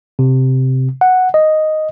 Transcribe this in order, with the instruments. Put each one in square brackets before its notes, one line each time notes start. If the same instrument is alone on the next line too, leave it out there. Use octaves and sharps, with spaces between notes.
[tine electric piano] C3
F#5
D#5